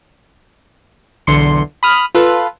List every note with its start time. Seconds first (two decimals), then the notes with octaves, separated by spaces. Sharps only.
1.27 B1 E2 D3 C6 C#7
1.83 B5 D#6 F6
2.15 F4 A4 B4